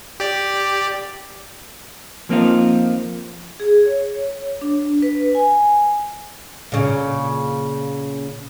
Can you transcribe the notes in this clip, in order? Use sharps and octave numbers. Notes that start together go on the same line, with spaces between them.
G4 D5
F3 A#3 C4 D#4 F4
G#4
C#5
D4
B4
G#5
A#2 C#3